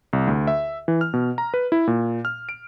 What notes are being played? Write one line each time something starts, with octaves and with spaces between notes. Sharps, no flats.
C2
D2
E5
E3
F6
B2
A#5
B4
E4
A#2
F6
D7